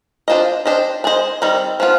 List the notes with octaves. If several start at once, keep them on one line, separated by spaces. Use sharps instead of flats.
D4 F4 C5 D#5
D4 G4 C5 D#5
D4 G#4 C5 D#5
D#3 G3 C4
F3 B3 F4